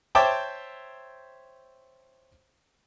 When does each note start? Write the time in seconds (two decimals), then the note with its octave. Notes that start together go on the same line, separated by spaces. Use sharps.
0.15 C5 C#5 E5 G5 A5 D6